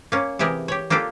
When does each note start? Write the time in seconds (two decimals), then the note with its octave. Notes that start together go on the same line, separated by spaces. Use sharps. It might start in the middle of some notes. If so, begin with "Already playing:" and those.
0.12 A#3 C#4
0.39 C3 E3 G4 G#4 A#4
0.68 G4 C#5
0.90 A#3 D4 F4 G4 A4